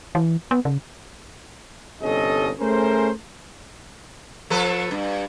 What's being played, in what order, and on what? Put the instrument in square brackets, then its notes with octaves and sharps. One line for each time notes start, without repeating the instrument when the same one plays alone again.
[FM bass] E3
B3
C#3
[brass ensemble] G1 C2 C#4 A4 D#5
A3 C#4 G#4 A#4 C5
[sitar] F3 A4 B4
G2